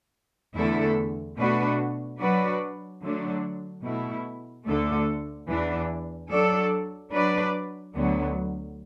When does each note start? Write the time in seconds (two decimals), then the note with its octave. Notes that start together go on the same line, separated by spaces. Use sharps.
0.55 E2 D3 A3 E4 A4
1.37 B2 A3 D4 F#4 B4
2.19 F#3 D4 F#4 B4 D5
3.01 D3 F#3 A3 D4
3.84 B2 A3 E4
4.66 D2 D3 A3 D4 A4
5.49 E2 E3 D4
6.30 F#3 D4 A4 D5
7.12 F#3 D4 B4 D5
7.94 D2 D3 F#3 B3